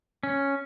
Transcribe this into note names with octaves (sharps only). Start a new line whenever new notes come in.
C#4